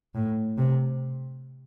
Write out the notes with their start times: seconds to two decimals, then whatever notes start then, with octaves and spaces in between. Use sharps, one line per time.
0.15 A2
0.58 C3